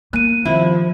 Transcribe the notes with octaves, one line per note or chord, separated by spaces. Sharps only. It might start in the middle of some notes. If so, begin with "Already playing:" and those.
A#3 F#6 D#7
C3 D#3 F3 E4